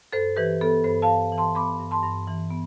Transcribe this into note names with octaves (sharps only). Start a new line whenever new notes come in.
G2 A4 C5
E3 G4 B4
B3 A4
G2 A4 C5
F5 A5
G2
E3
A5 C6
B3 B5 D6
G2
A5 C6
G2
E3
B3